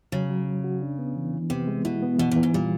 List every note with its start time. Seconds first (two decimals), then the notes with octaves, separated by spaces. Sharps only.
0.12 C#3 F#3
0.30 F#3
0.47 F#3
0.64 F#4
0.82 D4
0.99 B3
1.16 E3
1.34 E3
1.50 C3 B3
1.68 G#3
1.85 B2 E4
2.02 B3
2.19 B2 E3
2.31 A#2 E3
2.43 G#2
2.54 A#2 G3